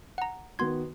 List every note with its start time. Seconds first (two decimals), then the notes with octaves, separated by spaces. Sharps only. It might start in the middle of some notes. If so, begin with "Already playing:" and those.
0.18 F#5 A#5
0.59 D#3 B3 F#4 C6 G#6